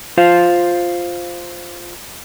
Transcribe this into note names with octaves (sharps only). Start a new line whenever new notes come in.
F4 C5 F5